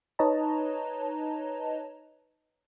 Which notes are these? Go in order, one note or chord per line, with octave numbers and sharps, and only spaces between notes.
D#4 B4 C#5 D#5 A5 A#5